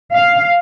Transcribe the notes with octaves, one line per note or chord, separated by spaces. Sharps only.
F5